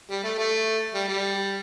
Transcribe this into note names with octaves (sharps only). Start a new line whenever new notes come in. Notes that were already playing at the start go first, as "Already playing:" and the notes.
G3
A3
A3
G3
G3